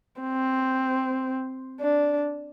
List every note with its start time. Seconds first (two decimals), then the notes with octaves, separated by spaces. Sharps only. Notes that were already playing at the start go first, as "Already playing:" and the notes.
0.21 C4
1.80 D4